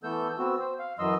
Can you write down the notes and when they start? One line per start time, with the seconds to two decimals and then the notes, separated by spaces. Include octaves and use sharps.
0.03 E3 A3 B3 A4 E6 G6
0.38 B3 C4 F#4 E6
0.60 C5
0.79 F5
0.99 F#2 E3 F#3 D#5 C6 E6